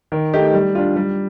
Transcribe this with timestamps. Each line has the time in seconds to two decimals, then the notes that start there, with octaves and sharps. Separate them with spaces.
0.12 D#3
0.34 A3 D#4 G4
0.53 G3
0.75 D4 F4
0.96 G3